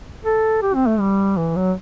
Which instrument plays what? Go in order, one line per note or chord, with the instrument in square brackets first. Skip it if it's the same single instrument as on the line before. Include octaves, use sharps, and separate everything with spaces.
[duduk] A4
G4
C4
A3
G3
E3
F#3